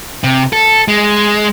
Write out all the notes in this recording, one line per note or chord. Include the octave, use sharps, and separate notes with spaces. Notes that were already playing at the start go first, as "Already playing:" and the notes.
C3
A4
G#3